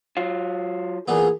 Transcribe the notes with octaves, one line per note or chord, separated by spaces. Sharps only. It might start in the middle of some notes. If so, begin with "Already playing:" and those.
F#3 F4
A#2 E3 B3 G#4